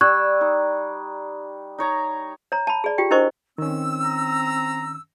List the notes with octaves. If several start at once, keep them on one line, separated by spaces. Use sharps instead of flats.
G3 C#6 E6 F#6 G#6
D#4
D#4 C#5 A#5
C#5 A#5
A5 B5
G#4 D5
F4 G4 G5
D4 E4 A#4 C5 D#5 C#6
D#3 C4 C#4 E6
A#5